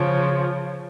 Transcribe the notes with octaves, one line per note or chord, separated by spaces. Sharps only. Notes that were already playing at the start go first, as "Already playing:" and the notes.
Already playing: C#3 F3